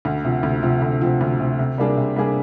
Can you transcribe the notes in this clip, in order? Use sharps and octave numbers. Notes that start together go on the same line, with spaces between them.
D2
C3 F3
D2
C3 F3
D2
C3 F3
D2
C3 F3
C3
G3 A#3 D4 G#4
C3
G3 A#3 D4 G#4